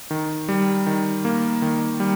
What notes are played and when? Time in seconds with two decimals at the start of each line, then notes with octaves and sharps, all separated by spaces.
0.11 D#3
0.49 G3
0.86 D#3
1.25 A#3
1.62 D#3
2.00 G3